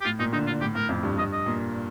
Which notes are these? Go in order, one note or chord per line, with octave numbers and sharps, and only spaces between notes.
G4
A2 F4
A#2 D#4
D3 D#4
D3 F4
A2 G4
A2 A#4
F2
G2
G2 D#5
D#5
A#2